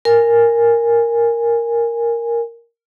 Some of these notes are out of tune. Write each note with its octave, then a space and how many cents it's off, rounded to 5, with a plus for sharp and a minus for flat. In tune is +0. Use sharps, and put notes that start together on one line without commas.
A#4 +0 G#5 -15